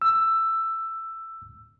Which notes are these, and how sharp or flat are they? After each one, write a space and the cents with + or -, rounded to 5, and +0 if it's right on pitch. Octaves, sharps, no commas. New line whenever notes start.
E6 +10